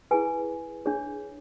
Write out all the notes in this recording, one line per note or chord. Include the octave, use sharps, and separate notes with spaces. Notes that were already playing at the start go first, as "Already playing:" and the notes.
E4 G#4 B4 G#5
D4 G#4 C#5